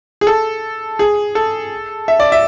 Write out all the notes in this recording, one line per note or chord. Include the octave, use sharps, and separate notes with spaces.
G#4
A4
G#4
A4
E5
D5
E5